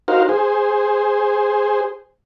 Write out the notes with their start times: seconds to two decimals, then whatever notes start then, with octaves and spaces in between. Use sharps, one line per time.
0.08 D#4 F#4 A#4 C5 F5
0.29 G#4 C5